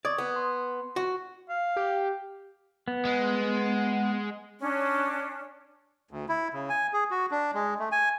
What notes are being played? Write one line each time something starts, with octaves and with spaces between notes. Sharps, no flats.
D5 C#6 D#6 G#6
B3
C6
F#4
F5
G4
B3
G#3
C#4 D4
D2
E4
C#3
G#5
G#4
F#4
D4
G#3
A3
G#5